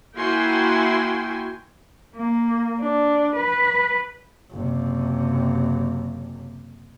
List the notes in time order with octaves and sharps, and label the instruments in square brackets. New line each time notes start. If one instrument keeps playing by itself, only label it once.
[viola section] A#3 E4 F#4 G5 G#5 C6
[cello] A#3
D4
B4
[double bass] F#1 C3